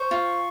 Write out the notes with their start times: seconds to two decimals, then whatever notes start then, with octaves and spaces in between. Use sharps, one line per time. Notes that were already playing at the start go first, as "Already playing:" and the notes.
Already playing: C5 C#6
0.11 F4